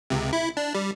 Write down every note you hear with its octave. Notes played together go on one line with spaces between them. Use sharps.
C#2 C3
E4
D4
G3